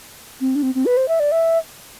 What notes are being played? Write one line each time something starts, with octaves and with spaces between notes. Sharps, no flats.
C4
D4
C4
C4
B4
C5
E5
D5
E5